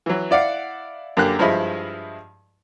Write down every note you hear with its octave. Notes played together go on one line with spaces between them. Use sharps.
E3 F#3
E4 D5 F5 F#5
F#2 D3 A#3 G4 F#6
G2 F3 G#3 E4 D#5 B5